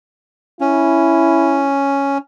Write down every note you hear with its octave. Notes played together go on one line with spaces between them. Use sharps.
C#4 E4